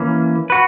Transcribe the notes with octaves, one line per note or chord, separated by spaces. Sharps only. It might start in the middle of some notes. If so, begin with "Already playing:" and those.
Already playing: E3 A#3 C#4
F#4 B4